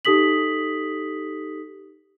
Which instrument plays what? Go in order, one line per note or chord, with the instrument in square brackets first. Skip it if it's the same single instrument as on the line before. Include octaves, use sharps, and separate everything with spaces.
[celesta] D#4 G4 A4 D#6 B6 F#7